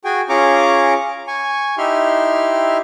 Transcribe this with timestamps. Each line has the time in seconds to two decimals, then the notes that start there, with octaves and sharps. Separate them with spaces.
0.05 F#4 G#4 G5 G#5
0.29 C#4 F4 G#4 A#5 C#6 D6
1.27 G#5 C#6
1.78 D#4 E4 G4 E5 C6 F6